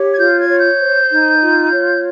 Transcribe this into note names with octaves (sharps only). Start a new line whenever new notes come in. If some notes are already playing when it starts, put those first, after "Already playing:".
Already playing: G4 C#5
G#6
F4 G6
G#6
C#5
G6
C5
D#4
F4
C#5